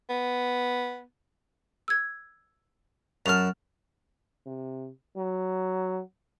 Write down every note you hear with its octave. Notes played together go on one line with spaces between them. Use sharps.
B3
E6 G#6
F#2 A5 F6 F7
C3
F#3